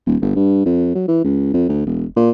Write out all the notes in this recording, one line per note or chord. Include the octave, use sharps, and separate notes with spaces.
D#1
G1
G2
F2
F#3
E3
C#2
F2
D2
E1
A#2